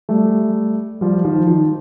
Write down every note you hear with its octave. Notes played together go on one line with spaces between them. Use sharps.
G3 A3
F3 G3
D#3 F3
D#3